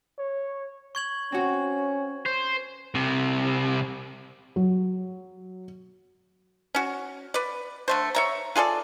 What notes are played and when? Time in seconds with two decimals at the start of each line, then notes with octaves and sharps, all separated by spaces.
0.18 C#5
0.95 C#6 G#6 F#7
1.32 C4 C#4 F#4
2.26 C5
2.95 C2 C3
4.56 F#3
6.75 C#4 F#4
7.34 B4 D5
7.88 D3 A3 C5
8.15 C#5 E5 A#5
8.56 F4 G#4 A4 D5